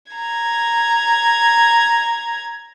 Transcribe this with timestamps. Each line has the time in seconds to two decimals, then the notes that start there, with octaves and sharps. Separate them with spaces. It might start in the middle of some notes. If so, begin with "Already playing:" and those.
0.12 A#5 G#6